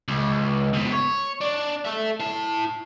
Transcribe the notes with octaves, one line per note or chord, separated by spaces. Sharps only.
C#2
G#2 B2
C#5
D4
A4 E5
E4 A5